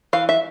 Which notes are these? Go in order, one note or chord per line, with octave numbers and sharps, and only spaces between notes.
E3 F5
E5